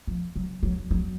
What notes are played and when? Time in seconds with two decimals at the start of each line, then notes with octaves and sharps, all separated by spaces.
0.07 F3
0.35 F#3
0.63 F#3
0.91 F#3